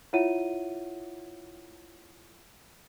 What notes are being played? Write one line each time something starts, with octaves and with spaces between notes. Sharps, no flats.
E4 F4 C#5 E5 F#5 D#7